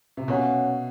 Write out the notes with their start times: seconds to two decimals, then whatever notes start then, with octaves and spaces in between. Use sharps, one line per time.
0.17 C3
0.28 B2 F#3 A#3 C#4 F#4